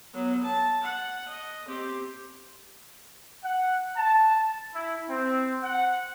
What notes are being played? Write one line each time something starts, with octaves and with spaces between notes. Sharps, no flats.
F#3 B3
A5
F#5
D#5
C4 G4
F#5
A5
E4
C4
F#5